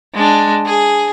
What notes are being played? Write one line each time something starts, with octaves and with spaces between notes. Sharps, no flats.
G#3 D4
G#4